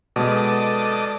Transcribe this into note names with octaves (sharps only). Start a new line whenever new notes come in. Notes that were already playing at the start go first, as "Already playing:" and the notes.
B2 G#3 A4 B4 D5 D#5